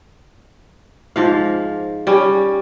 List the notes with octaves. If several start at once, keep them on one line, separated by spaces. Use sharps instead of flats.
G#2 F3 F5
G3 C#4